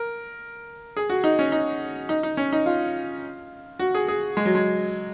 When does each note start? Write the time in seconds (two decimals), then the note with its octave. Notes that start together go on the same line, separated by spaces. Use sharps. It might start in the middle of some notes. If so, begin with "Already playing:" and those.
Already playing: A#4
0.97 G#4
1.10 F#4
1.24 D#4
1.39 C#4
1.52 D#4
2.09 D#4
2.23 D#4
2.37 C#4
2.53 D#4
2.66 F4
3.79 F#4
3.95 G#4
4.08 G#4
4.37 G#3
4.45 F#3
4.55 G#3